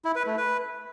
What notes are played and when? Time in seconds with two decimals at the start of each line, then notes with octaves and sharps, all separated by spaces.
0.05 E4
0.16 B4
0.27 A3
0.37 B4